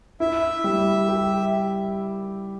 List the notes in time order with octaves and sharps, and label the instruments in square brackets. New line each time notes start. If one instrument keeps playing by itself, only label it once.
[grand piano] E4 [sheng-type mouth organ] E5
[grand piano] G3
G4